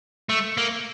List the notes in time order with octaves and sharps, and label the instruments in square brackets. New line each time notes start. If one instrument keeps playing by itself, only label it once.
[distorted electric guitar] A3
A#3